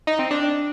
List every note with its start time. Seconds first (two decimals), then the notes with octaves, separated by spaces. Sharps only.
0.07 D#4
0.19 C4
0.31 D4